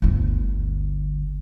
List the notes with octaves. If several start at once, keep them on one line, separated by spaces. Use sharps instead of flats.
G1 D2